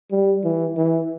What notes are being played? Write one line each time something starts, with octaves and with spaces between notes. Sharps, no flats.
G3
E3
E3